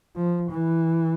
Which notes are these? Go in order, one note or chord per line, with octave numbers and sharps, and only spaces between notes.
F3
E3